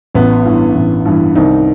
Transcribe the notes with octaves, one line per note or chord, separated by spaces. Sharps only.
A1 B3
G2 E3
A1
G2 E3
C2 D#3 D#4